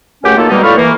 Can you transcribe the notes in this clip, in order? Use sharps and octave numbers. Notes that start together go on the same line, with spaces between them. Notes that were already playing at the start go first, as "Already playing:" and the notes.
C#2 F#2 A3 C#4 G4 F#5
D#3 F#3 A#3 F4 A4
B2 D#3 G3 G#3 A#3 D#4
A2 F4 D5 B5 C#6 F6
E3 A#3